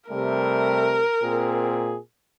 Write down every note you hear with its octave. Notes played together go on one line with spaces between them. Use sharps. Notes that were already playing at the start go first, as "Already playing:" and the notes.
C3 G3 A3 A#4
A#2 C4 G#4